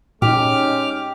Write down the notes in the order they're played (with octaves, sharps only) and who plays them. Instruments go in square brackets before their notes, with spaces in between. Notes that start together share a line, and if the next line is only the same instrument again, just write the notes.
[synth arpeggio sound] A#2 [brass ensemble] G#3 C#4 D#4 [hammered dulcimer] G4 [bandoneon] D6 F6